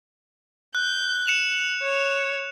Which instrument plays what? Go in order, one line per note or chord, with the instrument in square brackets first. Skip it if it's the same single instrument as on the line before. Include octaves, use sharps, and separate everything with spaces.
[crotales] F#6 [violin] G6
[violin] F#6 [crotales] C#7 E7 F7
[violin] C#5